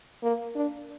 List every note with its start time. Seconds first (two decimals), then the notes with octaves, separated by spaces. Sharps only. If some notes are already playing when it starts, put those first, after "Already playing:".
0.23 A#3
0.55 D4